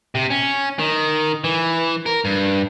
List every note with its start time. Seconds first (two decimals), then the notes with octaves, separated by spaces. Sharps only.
0.15 C3
0.30 C#4
0.79 D#3
1.44 E3
2.06 A#4
2.25 G2